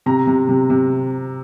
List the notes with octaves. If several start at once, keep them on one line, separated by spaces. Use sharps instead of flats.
C3 A#5
C3
C3
C3